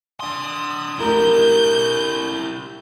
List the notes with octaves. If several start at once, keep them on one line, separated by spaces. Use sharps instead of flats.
D4 C6 D#6
A3 D4 E4 G4 A#4 G6